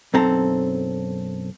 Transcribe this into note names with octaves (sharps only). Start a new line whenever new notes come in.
B1 F#2 C4 A4 A#5